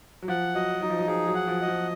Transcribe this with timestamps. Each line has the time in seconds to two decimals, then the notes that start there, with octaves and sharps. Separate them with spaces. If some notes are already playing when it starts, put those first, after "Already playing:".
0.22 F#3
0.28 F3 F#5
0.54 F#3 D#5
0.81 F#3 D#4
0.90 F3
0.98 F#3
1.07 F3 G#4
1.27 F#3
1.35 F#5
1.47 F3
1.61 D#5
1.68 F3